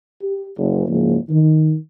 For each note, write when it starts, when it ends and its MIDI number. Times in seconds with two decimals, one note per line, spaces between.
0.21 0.48 67
0.57 0.85 30
0.88 1.17 30
0.88 1.17 44
0.88 1.17 49
0.88 1.17 53
0.88 1.17 58
1.29 1.74 51